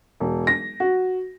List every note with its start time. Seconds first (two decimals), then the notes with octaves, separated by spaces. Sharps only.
0.20 E1
0.47 A#6
0.80 F#4